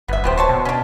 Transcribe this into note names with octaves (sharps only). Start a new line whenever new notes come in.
G1 B3 E5
D1 B3 G4 C5
C5 C#5 A5
B2
C#4 D4